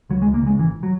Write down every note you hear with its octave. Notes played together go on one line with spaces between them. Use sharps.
C#2 F#3
G#3
C#2
A#3
C#3 G#3
G#1 E3
F#3